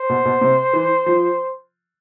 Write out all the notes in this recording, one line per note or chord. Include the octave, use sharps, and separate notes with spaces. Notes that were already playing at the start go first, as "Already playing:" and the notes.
Already playing: C5
B2
B2
C3
E3
F3